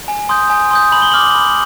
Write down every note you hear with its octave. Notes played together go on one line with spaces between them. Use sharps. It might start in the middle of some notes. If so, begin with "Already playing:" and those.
G#5
C6 D#6 G6
G#5
C6 D#6 G6
B5 F#7
G7
D6 F6 F#7
B5